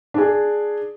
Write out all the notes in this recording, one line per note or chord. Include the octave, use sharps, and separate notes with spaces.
D4 G#4